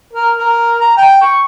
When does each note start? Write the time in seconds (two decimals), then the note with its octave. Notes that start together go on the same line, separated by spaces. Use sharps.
0.13 A#4
0.39 A#4
0.81 A#5
0.97 G5
1.22 C#6